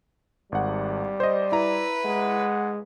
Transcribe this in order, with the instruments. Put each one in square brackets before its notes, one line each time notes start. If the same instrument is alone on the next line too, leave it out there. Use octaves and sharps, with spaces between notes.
[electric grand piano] G#1 F#5 [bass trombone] G3
[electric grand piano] C5 D#5 [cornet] D5
[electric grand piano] E4 A#5 [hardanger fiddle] B4
[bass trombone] G#3 [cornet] F#5